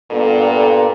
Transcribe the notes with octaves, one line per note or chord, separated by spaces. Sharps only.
G2 A#2 B3 A4